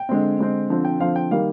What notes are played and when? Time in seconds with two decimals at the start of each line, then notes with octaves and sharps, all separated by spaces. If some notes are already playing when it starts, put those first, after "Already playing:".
Already playing: G5
0.09 D3 G#3 C4
0.39 D3 G#3 C4
0.70 D3 F3 C4
0.85 G5
1.00 D3 F3 C4 F5
1.16 G5
1.31 D#3 G3 A#3 F5